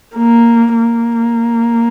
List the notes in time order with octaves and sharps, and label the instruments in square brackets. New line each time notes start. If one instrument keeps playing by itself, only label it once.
[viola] A#3
A#3